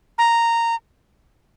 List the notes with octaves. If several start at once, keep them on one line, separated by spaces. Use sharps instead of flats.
A#5